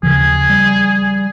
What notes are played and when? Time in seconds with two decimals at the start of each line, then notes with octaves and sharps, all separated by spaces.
0.03 D#2 C#3 F3 G#4
0.50 G3